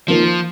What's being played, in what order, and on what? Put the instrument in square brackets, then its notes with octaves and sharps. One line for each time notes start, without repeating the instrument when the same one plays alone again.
[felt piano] D#3 A#3 F4 [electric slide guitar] F3